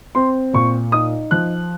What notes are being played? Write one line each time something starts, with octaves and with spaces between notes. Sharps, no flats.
C4 C6
A#2 C#6
D#4 D#6
F3 F#6